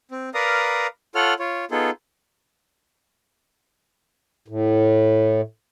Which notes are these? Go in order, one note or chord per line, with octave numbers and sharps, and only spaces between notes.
C4
A#4 B4 D5 F5 A#5 D#6
F4 A4 C#5 F#5 F6
F4 C#5
B3 D#4 F4 G#4 A4
A2